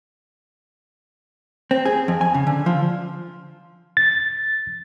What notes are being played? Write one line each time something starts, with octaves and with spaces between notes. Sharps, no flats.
C4
G#4
F2
G#5
C#3
D3
F3
A6